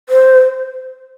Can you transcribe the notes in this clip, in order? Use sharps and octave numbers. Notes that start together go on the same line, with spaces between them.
C5